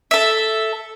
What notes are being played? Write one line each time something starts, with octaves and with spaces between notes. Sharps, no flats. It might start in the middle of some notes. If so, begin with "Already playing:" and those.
A4 E5